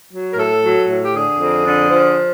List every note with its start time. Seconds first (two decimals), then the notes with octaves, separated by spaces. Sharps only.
0.11 F#3
0.31 A#4
0.37 A2 A4
0.63 F#3
0.89 A2
1.03 G4
1.13 D3 G#4
1.39 F2
1.64 D3
1.90 F3